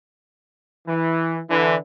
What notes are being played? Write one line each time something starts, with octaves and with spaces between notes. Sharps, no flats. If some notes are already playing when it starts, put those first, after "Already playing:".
E3
D3 E3